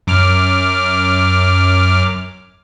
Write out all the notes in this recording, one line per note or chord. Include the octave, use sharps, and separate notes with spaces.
F#2 D6 F6